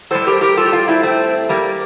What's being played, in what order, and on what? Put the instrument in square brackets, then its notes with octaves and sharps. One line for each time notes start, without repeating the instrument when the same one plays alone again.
[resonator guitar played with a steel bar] A2 G3 A4 C5
G4 A#4
G4 A#4
F4 A4
G4
D4 F4
C4 E4
A3 C4
G3 A#3